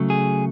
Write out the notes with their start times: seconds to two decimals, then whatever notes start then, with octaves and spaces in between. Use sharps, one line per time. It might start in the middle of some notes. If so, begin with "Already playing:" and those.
Already playing: C#3 F#3 A3
0.10 G#4